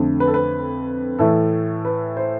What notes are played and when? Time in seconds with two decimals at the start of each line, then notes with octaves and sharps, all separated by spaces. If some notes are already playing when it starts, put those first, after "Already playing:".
Already playing: F2 D3 A3
0.20 B4
0.27 A4
0.34 B4
1.19 A2 E3 A3 A4
1.85 B4
2.17 C5